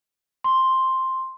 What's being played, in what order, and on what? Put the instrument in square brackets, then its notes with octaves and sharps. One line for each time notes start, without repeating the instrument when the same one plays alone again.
[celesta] C6